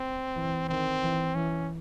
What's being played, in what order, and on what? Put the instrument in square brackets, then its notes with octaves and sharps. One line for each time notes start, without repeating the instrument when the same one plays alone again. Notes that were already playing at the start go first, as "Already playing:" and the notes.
Already playing: [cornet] C4
[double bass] E3
[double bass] D#3 [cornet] C4
[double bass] E3
[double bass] E3 [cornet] C#4